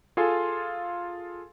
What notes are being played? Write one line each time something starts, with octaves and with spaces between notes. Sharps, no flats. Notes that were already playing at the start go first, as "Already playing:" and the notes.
F4 G#4 A4 F5 G#5 C6